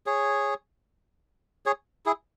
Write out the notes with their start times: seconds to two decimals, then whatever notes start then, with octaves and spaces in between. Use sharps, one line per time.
0.06 G#4 C#5
1.66 G#4 C#5
2.06 E4 G#4